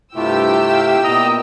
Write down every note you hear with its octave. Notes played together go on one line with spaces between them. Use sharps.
G2 C3 A3 E4 F4 G4 G5 E6
E4 E5 F5
A#2 B3 D#5 A#5 D#6